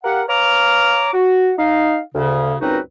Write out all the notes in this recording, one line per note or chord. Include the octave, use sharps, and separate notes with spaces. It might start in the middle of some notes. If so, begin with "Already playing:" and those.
G4 A#4 F5 F#5
B4 C#5 F5 A#5 D6 F6
F#4
D#4 F5
D2 C#3
C#2 F#2 C4 D#4 F#4 B4